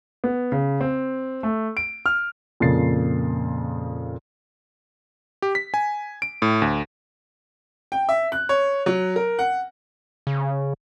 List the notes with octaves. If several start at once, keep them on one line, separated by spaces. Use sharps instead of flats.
B3
C#3
C4
A3
D7
F6
F2 A#2 C#3 A6 C7
G4
B6
G#5
D7
A2
D2
G5
E5
F#6
C#5
F#3
A#4
F#5
C#3